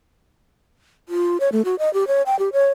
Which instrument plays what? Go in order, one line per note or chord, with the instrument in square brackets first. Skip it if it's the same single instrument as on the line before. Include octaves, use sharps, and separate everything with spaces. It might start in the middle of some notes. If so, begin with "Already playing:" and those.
[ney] F4
C#5
A3
F#4
D#5
G4
C#5
G5
G4
C#5